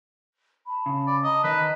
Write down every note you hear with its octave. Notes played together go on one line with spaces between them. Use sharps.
A5 B5
C#3
D5
D#5 A5 A#5
D#3 B4 D#5